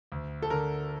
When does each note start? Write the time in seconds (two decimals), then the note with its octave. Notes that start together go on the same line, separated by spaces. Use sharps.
0.12 D2
0.42 A4
0.50 D3 A#4